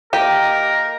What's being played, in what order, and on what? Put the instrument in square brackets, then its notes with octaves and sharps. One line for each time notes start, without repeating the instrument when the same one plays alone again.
[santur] A#3 [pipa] G4 [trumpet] A#4 [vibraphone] D#5